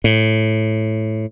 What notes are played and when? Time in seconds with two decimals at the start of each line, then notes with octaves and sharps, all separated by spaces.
0.04 A2